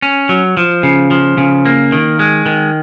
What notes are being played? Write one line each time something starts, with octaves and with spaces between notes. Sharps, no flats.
C#4
F#3
F3
C#3
F3
C#3
A#3
D#3
G#3
D#3